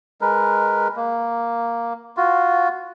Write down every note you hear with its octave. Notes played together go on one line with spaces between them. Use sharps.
G#3 A#4 B4
A#3
F4 F#4